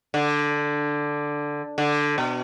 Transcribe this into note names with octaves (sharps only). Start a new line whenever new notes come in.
D3
D3
B2